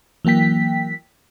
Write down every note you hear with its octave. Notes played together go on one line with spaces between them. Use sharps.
E3 F#3 A#3 G5 B6